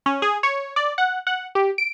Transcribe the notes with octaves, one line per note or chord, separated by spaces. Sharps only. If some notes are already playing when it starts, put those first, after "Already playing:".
C#4
G#4
C#5
D5
F#5
F#5
G4
D7